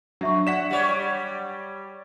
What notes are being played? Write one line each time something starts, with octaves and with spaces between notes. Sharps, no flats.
F#3 D4 E5 C#6
D5 F#5 B6 E7
G3 C#5